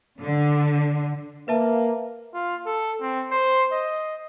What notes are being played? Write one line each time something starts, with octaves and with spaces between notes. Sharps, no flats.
D3
A#3 B4 E5 A5
F4
A4
C4
C5
D#5